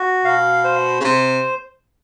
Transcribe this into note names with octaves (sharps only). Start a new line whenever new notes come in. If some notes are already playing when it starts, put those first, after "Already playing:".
Already playing: F#4
B2 F5
C5
C#3
C3 C5